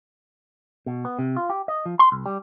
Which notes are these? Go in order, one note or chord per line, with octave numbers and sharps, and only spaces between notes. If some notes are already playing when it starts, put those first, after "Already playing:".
B2
B3
C3
F4
G4
D#5
F3
C6
C2
G3